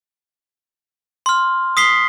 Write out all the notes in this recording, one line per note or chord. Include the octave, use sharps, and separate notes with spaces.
C6 F6
D#6 B6 C7 G7